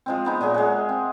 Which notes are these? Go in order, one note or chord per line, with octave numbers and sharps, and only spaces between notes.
F3 G#3 C4
G#3 B3 D#4
A#2 F#3 G#4 E5
G#3 G#4 F#5
C4